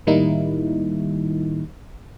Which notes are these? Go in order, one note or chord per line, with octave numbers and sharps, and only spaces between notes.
A2 D#3 G3 A#3 D#4 E4